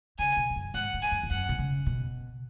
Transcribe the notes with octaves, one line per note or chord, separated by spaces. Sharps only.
C#3 G#5
B2
G#2
F#2
G#2 F#5
A2
G#5
F#2
E2
F#2 F#5
B2
C#3
B2